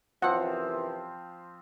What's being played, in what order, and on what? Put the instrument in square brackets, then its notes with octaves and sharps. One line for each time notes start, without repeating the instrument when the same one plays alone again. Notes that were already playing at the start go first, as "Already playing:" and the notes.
[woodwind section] F#2 C3 E3 [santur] F3 C4 [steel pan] F#5